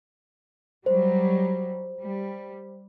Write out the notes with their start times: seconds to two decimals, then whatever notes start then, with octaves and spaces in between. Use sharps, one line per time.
0.86 F#3 G3 C5
2.01 G3